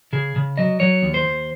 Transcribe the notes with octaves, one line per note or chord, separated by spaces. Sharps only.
C#3 G#4
C#3
F#3 D#5
F#3 C#5
D#2
C5
D#2